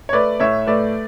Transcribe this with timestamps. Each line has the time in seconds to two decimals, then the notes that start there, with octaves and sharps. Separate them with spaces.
0.09 C#5
0.13 A3 B4 D5
0.40 A2 C#5 E5
0.67 A3 B4 D5